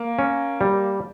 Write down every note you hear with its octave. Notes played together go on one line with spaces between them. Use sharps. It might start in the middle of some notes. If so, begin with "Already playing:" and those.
Already playing: A#3
C#4
G3